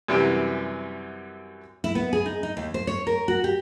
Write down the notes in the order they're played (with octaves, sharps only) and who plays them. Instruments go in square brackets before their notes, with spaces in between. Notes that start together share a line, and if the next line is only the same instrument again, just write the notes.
[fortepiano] F#2 C3 E3 G3
[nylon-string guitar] E4
B3
G#4
D#4
D#4
D#2
C5
C#5
A#4
F#4
G4